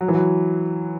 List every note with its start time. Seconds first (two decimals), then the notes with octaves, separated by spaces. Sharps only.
0.01 F#3
0.08 E3
0.15 F#3